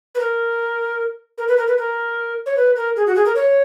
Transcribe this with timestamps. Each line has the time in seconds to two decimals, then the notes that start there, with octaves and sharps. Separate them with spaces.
0.15 B4
0.20 A#4
1.38 A#4
1.48 B4
1.57 A#4
1.68 B4
1.78 A#4
2.46 C#5
2.57 B4
2.76 A#4
2.96 G#4
3.07 F#4
3.16 G#4
3.26 A#4
3.36 C#5